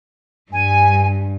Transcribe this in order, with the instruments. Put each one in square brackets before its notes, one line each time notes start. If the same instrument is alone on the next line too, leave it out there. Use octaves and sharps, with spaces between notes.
[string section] G2 [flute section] G#5